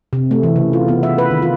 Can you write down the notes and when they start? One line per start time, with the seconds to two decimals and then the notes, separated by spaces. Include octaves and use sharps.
0.13 C3
0.31 A3
0.43 E3
0.56 C#3
0.73 F4
0.88 B3
1.03 E5
1.18 B4
1.31 D#3
1.42 F4